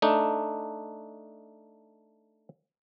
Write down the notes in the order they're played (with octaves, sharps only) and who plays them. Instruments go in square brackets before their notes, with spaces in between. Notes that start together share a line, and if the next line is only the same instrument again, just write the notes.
[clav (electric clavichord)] A3 D4 D#4